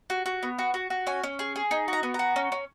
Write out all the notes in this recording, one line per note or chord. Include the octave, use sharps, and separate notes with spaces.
F#4
F#4
B3
F#4
F#4
F#4
C#4 G#5
C#4
G#4
G#4
D#4 G#5
F#4 A#5
B3
F#4 A#5
C#4
C#4